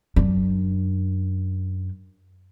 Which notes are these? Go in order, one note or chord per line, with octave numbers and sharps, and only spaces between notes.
F#2 D4